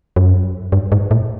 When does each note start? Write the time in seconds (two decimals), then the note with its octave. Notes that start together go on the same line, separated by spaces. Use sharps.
0.16 F#2
0.72 G2
0.92 G#2
1.11 A2